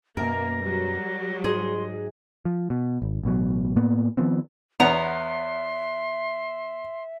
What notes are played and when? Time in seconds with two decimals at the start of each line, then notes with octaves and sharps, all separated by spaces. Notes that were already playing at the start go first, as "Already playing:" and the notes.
0.17 F#2 B2 A#3 A#4 A#6
0.63 F#3 G3
1.44 G#2 G#4 D#5 C6
2.45 F3
2.70 B2
3.02 G#1
3.23 A1 B2 F#3
3.76 A2 A#3 B3
4.17 D#3 F3 B3 C4
4.80 E2 B3 C#5 E5 F#5 A#5 C6